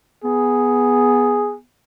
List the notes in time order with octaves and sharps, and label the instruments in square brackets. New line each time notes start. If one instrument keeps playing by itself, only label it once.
[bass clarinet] B3 [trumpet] G#4